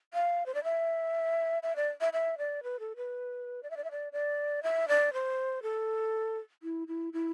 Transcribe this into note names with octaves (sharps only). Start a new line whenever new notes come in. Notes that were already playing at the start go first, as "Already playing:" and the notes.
F5
C5
D5
E5
E5
D5
E5
E5
D5
B4
A4
B4
D5
E5
D5
E5
D5
D5
E5
D5
C5
A4
E4
E4
E4